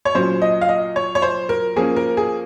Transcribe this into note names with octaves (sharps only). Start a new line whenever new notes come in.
C#5
A#2 F#3 C#4 C5
D#5
F5
D#5
C#5
C#5
C5
A#4
F3 A#3 C#4 G#4
A#4
G#4